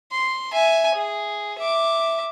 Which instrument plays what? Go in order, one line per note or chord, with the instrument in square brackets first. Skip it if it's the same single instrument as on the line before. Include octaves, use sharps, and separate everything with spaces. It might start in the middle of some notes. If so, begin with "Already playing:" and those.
[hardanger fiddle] C6
E5 G#5
G#4
E5 D6